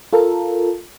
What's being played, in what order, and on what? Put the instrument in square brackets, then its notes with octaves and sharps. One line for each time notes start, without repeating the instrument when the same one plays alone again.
[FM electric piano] F4 A4 A#4